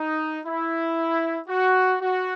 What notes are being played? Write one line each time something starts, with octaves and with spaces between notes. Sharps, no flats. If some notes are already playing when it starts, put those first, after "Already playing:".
Already playing: D#4
E4
F#4
F#4